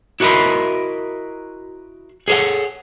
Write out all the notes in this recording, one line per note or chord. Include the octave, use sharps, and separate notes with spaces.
E4 F#4 A#4 D#5 B5 C6
G#4 A4 C5 C#5 F#5